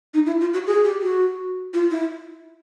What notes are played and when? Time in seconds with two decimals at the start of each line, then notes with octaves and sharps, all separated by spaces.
0.14 D#4
0.26 E4
0.40 F4
0.54 F#4
0.67 G#4
0.84 G4
1.02 F#4
1.74 F4
1.91 E4